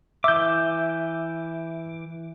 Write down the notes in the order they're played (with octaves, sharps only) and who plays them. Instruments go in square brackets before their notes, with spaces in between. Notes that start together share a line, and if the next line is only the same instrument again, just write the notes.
[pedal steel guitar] E3 D6 [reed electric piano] E5 G6